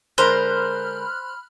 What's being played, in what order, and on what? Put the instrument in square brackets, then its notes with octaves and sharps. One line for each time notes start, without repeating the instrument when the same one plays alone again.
[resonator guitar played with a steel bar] D3 G#3 A#4 [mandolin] C5 [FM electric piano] B5 F6 F#6